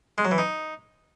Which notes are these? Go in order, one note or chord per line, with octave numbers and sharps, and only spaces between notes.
G#3
F#3
E3
D#4